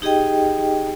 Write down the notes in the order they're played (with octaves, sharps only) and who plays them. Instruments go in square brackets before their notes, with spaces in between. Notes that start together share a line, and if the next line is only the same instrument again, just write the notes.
[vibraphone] D#4 G4 G#4 D#5 G5